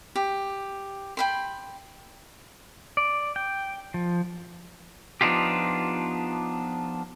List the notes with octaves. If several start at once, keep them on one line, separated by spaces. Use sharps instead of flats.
G4
G5 B5 C6
D5
G5
F3
F3 B3 D4 D#4 F4 G4